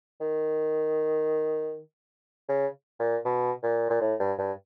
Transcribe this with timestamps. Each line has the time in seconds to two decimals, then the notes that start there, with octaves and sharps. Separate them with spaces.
0.21 D#3
2.49 C#3
3.00 A#2
3.25 B2
3.63 A#2
3.90 A#2
4.01 A2
4.20 G2
4.39 G2